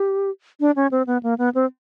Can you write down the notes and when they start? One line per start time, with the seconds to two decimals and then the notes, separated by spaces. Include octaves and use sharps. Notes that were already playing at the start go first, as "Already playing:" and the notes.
Already playing: G4
0.60 D4
0.76 C#4
0.91 C4
1.07 B3
1.23 A#3
1.38 B3
1.55 C4